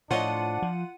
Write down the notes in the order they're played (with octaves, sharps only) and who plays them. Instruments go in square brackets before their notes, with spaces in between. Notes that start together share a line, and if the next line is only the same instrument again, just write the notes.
[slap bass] A2 [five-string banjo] F3 C#5 D#5 [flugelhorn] D4 [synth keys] F4 F#5 D#7
[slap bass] F3